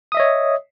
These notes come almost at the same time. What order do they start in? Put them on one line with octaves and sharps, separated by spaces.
D#6 E5 D#5 C#5